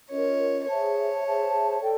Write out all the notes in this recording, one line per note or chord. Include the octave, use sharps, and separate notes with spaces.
C#4 F4 A#4 C#5 D#5
G#4 C5 C#5 E5 A5
G#4 C5 E5 A5
A4 D5 G5